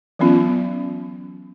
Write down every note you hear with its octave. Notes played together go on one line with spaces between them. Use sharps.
E3 F#3 B3 C#4 F4